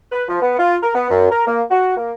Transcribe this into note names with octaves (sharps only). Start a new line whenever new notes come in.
B4
F3
B3
F4
A#4
B3
F#2
A#4
A#3
F#4
A#3